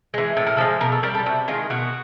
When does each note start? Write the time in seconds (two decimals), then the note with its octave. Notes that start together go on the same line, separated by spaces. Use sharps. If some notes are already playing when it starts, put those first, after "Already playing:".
0.14 E3 G#3
0.37 A2 A4
0.47 A#4
0.57 F3 G#3 A4
0.81 B2 A#4
0.92 A4
1.03 G3 A#4
1.15 A4
1.26 C3 F#4
1.48 D#3 G#3 F4
1.70 B2 F#4